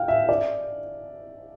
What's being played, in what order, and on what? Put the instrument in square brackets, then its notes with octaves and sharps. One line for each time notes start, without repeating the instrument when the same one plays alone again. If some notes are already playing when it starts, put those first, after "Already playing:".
Already playing: [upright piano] F5 G5
E5
D5